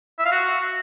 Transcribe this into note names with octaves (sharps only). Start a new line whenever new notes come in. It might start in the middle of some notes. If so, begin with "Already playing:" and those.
E5
F5
F#4